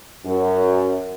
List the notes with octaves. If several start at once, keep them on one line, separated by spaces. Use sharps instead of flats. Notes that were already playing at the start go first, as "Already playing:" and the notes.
F#2